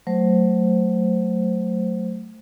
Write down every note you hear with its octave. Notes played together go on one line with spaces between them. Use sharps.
F#3 A3 C5